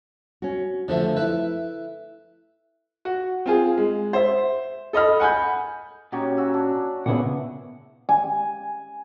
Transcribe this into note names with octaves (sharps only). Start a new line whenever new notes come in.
C#4 F#4
D3 F3 A3 A4 C5 E5
E4 B4 E5
F#4
C4 F4 G#4
G#3
C5 E5
A4 D#5 B5 F6
F#5 G#5 B5 G6
A#2 F#3 C#4 D#4 G4
F#4 E5 G#5
D4 G#5
A#2 C#3 B3 E4 D5 F#5 G#5
G#5